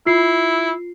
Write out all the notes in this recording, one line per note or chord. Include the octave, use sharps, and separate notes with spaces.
E4 F4 C7